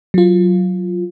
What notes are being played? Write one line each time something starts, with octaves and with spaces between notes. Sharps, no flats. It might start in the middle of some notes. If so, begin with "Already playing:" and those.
F#3 F4